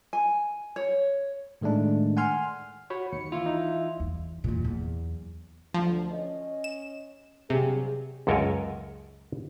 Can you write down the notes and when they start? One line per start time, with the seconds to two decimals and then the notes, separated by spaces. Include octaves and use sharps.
0.13 G#5
0.76 C#5
1.61 A2 D#3 G#3 A3 D4
2.17 F#5 G#5 C6 F6
2.90 F#4 C#5 B5
3.12 D#2 C#7
3.32 E3 E4 F4
3.46 D#4 E5
4.00 E2
4.44 E2 A#2
4.64 E2 F#3
5.74 D2 F3
6.12 C#4 D#5
6.64 E7
7.50 G2 C3 F#3 G#4
8.27 C#2 F#2 A4 A#4 C#5 G#5